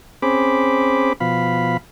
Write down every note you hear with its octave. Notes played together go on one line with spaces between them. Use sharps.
C4 C#4 G#4 C5 B5 D6
B2 F3 F5 B5